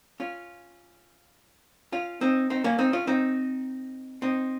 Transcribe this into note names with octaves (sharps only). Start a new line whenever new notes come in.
C#4 F4
C#4 F4
C4 D#4
C4 D#4
A#3 C#4
C4 D#4
C#4 F4
C4 D#4
C4 D#4